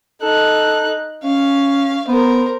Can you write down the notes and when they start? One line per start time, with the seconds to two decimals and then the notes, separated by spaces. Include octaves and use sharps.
0.22 D#4 A4 F#6
1.24 C#4 F5
2.08 B3 A#4 C5